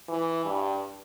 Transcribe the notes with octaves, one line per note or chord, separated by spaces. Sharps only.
E3
G2